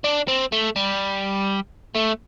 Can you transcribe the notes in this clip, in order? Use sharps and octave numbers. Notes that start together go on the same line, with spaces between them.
D4
C4
A3
G3
A3